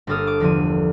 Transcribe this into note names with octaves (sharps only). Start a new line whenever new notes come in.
G1 A#3 D4 A4 D#6 F6
D6
E2 D3 F3 D#7